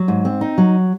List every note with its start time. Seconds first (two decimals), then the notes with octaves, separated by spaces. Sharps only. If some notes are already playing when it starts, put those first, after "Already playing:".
Already playing: F#3
0.08 G#2
0.25 C4
0.41 D#4
0.58 F#3